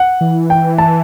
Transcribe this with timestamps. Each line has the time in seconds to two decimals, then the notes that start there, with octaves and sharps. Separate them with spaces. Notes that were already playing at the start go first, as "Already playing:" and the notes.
Already playing: F#5
0.21 E3
0.50 G5
0.78 A5